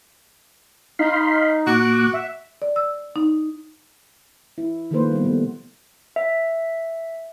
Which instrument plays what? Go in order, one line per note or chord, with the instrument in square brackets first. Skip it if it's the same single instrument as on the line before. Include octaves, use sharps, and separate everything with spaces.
[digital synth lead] D#4 [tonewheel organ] F5 B5 C6
[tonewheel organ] A#2 D6 F#6 [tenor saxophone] F#4
[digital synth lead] E5
[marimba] D5
E6
D#4
[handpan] E4
D#3 F3 A3 A#3 B4 C5
G3 B3
B2 A3
[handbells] E5